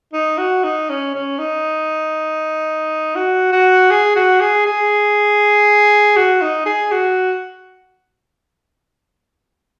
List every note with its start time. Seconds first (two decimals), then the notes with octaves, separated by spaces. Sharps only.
0.13 D#4
0.38 F#4
0.64 D#4
0.89 C#4
1.15 C#4
1.38 D#4
3.15 F#4
3.52 F#4
3.91 G#4
4.16 F#4
4.41 G#4
4.66 G#4
6.17 F#4
6.42 D#4
6.66 G#4
6.92 F#4